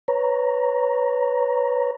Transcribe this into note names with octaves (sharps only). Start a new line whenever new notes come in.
B4 C#5 A#5